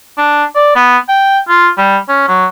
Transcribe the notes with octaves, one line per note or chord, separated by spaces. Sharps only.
D4
D5
B3
G5
F4
G3
C#4
F#3